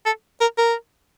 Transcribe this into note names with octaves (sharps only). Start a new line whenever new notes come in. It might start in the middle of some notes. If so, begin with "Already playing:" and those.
A4
A#4
A#4